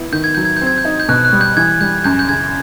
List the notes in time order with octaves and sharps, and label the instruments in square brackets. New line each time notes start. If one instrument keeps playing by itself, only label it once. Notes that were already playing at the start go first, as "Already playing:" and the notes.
Already playing: [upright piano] B3 E4
[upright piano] D#3 [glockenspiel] G6
[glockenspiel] G#6
[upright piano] F#3 [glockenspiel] G6
[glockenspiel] G#6
[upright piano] C4 [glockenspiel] G6
[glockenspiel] G#6
G6
[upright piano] D#4
[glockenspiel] G6
[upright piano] B2 [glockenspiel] F#6
[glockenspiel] F#6
[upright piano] G3
[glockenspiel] G6
[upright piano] E3 [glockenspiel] G#6
[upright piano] G3 [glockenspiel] G6
[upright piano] F#2 [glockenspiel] G6
[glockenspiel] G6
[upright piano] C#3 [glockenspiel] G#6